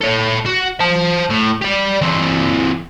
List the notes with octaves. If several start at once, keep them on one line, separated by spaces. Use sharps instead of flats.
A4 C#5
F#4
C5 A5
A2
G4 D5
E3 C4